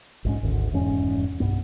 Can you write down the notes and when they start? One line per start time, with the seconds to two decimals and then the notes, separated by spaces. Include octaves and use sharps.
0.25 A#1 G#2 C#4
0.43 G#1 D2
0.72 F1 E2 G#2 C#4
1.40 B1 G2 B3